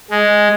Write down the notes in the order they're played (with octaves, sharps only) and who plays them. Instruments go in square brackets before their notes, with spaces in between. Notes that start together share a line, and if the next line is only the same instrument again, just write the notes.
[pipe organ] G#3